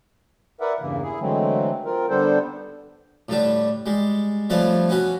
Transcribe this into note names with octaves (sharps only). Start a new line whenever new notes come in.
E4 A#4 B4 D5 E5 F#5
E2 G2 C#3 E3 A#3
E4 G#4
D3 E3 F#3 G#3 A3 C4
C4 F4 A#4
D3 G3 B3 D4 A4 C5
A2 D3 G3 D4
G3 G#3
F3 G3 A3 C4 B4 C#5
B3 C#4 F#4 B4